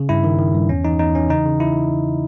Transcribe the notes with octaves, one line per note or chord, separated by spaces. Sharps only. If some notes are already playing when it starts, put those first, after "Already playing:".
Already playing: C#3
G2 E4
D#3
D#3
G2
E2 C#4
E3 D#4
E2 D#4
E3 C#4
C#3 D#4
C#3
E4